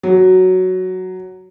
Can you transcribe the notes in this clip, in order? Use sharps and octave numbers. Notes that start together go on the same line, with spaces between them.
F#3